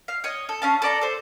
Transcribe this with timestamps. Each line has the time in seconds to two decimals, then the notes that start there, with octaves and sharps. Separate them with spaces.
0.08 F5
0.24 C#5 D#5
0.49 A4
0.62 C#4 F5 A5
0.82 A4 D5 A#5
1.01 A4 C5